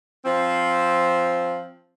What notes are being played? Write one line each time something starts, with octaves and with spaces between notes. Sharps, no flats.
F3 C4